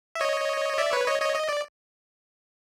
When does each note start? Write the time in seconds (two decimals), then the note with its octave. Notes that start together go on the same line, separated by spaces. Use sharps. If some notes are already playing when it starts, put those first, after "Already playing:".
0.15 E5
0.21 C#5 D#5
0.78 D5 E5
0.92 B4 C#5
1.07 C#5 D#5
1.21 C#5 D#5
1.35 D#5
1.49 D5